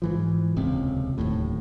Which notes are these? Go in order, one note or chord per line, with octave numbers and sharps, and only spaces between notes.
G#2 E3 F3
D#1 C#2 C3 C4
D1 D#2 A2